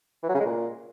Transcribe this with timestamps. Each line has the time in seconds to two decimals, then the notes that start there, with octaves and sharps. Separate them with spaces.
0.23 E3
0.29 F#3
0.34 C#3
0.40 G#3
0.46 A#2